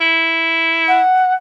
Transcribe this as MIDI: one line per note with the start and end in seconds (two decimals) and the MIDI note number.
0.01 1.02 64
0.87 1.34 78